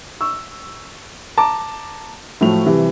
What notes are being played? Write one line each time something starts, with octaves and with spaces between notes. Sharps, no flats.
C#6 E6
A5 A#5 D6
A2 F3 F#3 A3 F7
C3 E3 G3